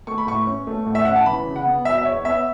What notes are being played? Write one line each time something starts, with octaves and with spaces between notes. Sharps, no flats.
A3 C#6
B5
A2 C#6
C#4
A3
A2
E5
C#4 F#5
A5
E3 B5
C#3
F#5
B3
B2 E5
E5
E2 C#5
B3 E5